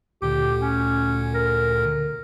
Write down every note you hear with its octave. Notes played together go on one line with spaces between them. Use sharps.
D2 A#2 D3 G4
C#4
A#4